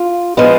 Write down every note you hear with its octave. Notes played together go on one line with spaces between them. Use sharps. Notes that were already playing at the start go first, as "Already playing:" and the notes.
Already playing: F4
F3 G#3 B3